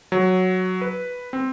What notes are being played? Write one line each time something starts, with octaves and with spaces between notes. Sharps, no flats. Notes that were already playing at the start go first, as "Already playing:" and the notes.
F#3
B4
C4